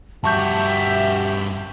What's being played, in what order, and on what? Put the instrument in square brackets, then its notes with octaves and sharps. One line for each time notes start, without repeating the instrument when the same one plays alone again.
[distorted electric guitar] G2 F#4 [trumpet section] G4 [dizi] E5 [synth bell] A5 C#6 G6